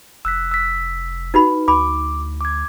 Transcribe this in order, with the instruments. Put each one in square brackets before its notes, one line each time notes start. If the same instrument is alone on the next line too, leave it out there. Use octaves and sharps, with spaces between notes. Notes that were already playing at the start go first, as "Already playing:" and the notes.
[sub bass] F1 [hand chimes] E6 F#6 B6
[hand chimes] E6 B6
[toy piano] D#4 F#4 B5 [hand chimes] B4
[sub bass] D2 [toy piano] B5 [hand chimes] D6
[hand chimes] D6 G#6